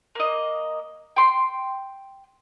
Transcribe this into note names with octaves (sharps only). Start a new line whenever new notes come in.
A#3 D#5
G5 C6